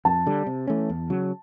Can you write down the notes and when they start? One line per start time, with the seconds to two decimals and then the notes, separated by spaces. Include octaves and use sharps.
0.05 F2 A5
0.27 D3 G3
0.47 C3
0.67 E3 A3 C#4
0.90 E2
1.10 C#3 F#3